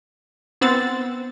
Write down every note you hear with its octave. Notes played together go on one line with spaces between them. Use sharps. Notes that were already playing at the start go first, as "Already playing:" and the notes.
B3 C4 F#5 E6 A6